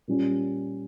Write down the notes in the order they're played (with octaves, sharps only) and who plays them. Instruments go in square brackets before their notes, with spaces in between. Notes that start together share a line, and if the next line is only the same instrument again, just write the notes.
[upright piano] A#2 G3 C#4